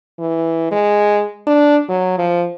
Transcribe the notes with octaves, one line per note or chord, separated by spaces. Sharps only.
E3
G#3
D4
F#3
F3